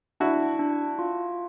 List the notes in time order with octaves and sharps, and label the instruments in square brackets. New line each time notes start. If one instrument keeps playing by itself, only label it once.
[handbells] D4 [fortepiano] E4 F#4
[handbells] D4
F4